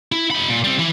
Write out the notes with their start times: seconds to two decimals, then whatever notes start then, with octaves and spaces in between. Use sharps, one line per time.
0.12 E4
0.31 D#4 B5
0.49 A#2
0.64 G3 C4
0.79 E3 E4